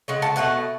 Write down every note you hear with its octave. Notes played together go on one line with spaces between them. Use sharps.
C#3 G#3 F#5
F#5 A5
B2 F#3 A3 F#5